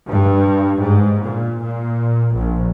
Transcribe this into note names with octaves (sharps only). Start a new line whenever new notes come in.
G2
G#2
A#2
A#2
A#1